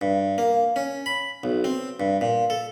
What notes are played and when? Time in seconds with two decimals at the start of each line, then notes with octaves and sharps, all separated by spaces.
0.01 G2
0.38 A#3
0.76 C#4
1.06 B5
1.44 B1
1.64 C4
2.00 G2
2.21 A#2
2.50 A4